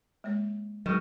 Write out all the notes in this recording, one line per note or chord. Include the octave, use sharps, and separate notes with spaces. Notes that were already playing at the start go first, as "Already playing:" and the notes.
G#3 A#3 C#5
B2 D#3 F#3 G#3